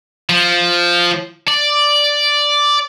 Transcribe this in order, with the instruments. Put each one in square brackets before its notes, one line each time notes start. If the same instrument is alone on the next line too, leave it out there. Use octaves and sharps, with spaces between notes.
[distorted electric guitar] F3
D5